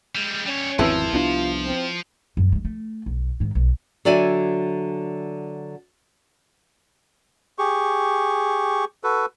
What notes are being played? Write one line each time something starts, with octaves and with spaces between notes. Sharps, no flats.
G3 G#3
G3 C#4 C#5
G#1 E2 F3 C4 E4 B4 A5
C2 B3 D4 F4
C4
F#2
G3 G#3
A3
B1
G#2 D#3
B1
D3 F#3 D5 E5 G#5
G4 G#4 C#6
F#4 A4 B4